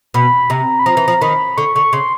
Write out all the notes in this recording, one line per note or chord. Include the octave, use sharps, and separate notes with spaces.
B2 B5
C3 A#5
B5
F3 A#5
E3
F3
D#3 B5
D3 C#6
D3 C#6
C#3 C6